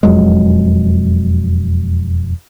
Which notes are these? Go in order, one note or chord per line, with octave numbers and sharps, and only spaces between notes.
E1 F2 F#3 G#3